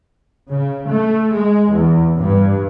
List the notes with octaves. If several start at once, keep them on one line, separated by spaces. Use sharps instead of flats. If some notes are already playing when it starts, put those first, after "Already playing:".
C#3
A3
G#3
E2
G2